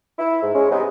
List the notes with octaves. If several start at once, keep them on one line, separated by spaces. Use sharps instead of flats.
E4
G#2
G#3 C#4
C3 G#3 B3 D#4